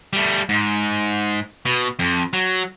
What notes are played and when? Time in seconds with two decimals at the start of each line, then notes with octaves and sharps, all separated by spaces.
0.13 G3 A3
0.49 G#2
1.66 B2
1.99 F2
2.33 F#3